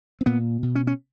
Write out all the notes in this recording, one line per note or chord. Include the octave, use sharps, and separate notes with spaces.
C4
A#2 B3
B2
C#4
C#4